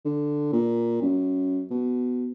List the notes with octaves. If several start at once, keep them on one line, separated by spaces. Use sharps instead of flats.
D3
A#2
F#2
B2